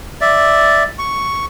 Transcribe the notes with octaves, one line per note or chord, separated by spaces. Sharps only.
D5 E5
C#6